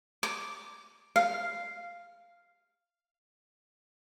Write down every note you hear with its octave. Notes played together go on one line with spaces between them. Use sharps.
D6
F5